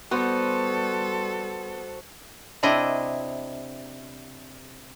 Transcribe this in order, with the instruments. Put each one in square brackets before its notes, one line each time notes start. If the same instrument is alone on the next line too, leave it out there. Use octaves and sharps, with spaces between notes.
[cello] G3 A4 [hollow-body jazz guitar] B3 F#5 [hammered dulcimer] F#4 C5 D5
[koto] C3 D4 E4 D#5